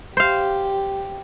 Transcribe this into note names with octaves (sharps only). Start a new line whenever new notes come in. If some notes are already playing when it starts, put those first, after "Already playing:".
G4 C5 F5